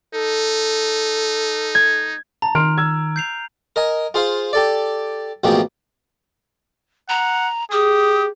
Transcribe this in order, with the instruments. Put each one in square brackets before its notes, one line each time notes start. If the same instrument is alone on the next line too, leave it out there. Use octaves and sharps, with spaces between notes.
[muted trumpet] D#4 [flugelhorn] A4
[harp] G#6
[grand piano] A5 [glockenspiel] A#5
[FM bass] D#3 [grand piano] C6 F6 D7
[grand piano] E6 G#6
[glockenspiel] G6 C7 F7
[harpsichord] A#4 D#5 G#5
F4 G#4 C5 F5
G4 A4 D5
A1 B2 F3 A#3 G4 G#4
[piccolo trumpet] F#5 [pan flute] A#5
[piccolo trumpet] G4 [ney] G#4 [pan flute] D#6